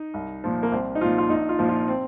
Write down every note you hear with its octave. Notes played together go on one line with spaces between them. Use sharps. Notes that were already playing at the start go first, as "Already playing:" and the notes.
Already playing: D#4
C2
A#2 F3
A#3
C2 C4
D#4
A#2 F3 F4
F4
A#1 D#4
F4
A#2 F3
F4
C4